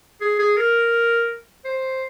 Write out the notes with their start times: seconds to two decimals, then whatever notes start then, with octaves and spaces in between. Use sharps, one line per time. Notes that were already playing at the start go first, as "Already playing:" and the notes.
0.21 G#4
0.39 G#4
0.57 A#4
1.65 C5